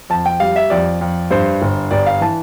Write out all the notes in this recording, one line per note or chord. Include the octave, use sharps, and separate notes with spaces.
F2 A5
G5
G3 F5
E5
F2 D5
F2
G2 C5
G1
G1 D5
F5
E3 A5